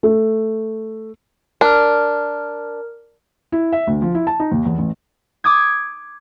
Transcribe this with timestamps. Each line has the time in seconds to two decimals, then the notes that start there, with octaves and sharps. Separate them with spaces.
0.03 A3
1.61 D4 A#4 F6
3.52 E4
3.72 E5
3.87 D2
4.02 F3
4.15 E4
4.27 A5
4.40 D#4
4.52 D#2
4.65 E2
4.78 A1
5.44 D6 D#6 G#6